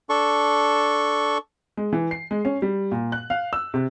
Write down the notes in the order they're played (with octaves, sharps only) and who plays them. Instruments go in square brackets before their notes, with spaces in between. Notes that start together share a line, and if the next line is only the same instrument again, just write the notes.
[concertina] D4 A4 C#6
[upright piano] G#3
E3
C7
G#3
C#4
G3
A#2
F#6
F5
E6
C3